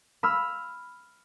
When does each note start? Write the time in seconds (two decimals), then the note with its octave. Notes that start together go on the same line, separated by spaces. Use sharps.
0.23 B5 E6 F6